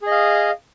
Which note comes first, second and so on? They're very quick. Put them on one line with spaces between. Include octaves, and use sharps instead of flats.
G#4 D#5 F5